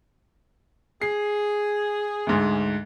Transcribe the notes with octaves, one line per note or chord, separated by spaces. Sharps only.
G#4 C7
D2 G#2